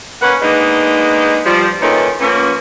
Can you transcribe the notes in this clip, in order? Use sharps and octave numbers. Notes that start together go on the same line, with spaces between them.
A#3 C#4 B4 F#5
G#3 A#3 B3 D4 D#4
F3 G3
A#2 D#3 E3 C#4 D#4 A4
F3 A#3 B3 C#4